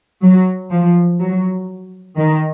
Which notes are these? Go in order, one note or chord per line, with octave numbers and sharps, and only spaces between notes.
F#3
F3
F#3
D#3